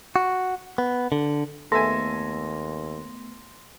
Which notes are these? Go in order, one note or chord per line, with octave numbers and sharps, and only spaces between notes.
F#4
B3
D3
D#2 A3 B3 A4 E5 G#5 C6 A#6